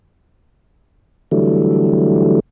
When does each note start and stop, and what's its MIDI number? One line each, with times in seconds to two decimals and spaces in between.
1.31 2.40 50
1.31 2.40 52
1.31 2.40 54
1.31 2.40 55
1.31 2.40 57